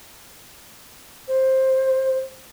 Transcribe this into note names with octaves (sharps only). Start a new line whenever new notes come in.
C5